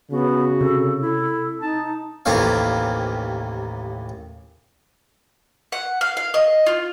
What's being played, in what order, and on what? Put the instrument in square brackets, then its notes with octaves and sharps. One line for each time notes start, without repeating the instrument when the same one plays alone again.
[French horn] C#3 [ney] B3 [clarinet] F#4
[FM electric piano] C3 [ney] A4
[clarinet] E4 [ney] A4
[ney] D#4 [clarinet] A5
[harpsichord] A1 D#2 C3 E3 F5
[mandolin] F#5
F5
F5
D#5
F4